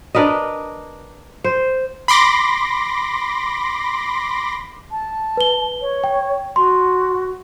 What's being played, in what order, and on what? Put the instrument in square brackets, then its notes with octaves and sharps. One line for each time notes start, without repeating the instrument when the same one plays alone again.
[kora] D4 A#4 B4 D#5
C5
[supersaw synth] B5 C6 D6 A#6
[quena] A5
[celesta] B4 G7
[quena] C#5
[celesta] G5
[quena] F#4 [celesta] C6